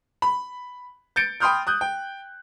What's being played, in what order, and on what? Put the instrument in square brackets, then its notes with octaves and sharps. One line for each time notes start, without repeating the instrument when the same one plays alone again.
[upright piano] B5
G6 A6 C#7 D7
G5 B5 C6 D#6 F6 G6
D#6 F#6 G6
G5